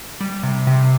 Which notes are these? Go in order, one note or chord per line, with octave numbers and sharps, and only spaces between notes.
G3
C3
C3